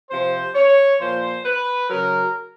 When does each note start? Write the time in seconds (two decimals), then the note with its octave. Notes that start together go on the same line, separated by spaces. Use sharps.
0.10 C3 F3 C5
0.55 C#5
1.00 A#2 F3 C5
1.45 B4
1.90 C#3 F#3 A#4